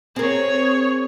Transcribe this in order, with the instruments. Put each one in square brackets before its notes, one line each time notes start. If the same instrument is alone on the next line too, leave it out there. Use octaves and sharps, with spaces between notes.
[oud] C4 A#4 [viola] G#4 C#5